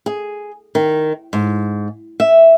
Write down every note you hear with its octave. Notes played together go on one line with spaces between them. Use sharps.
G#4
D#3
G#2
E5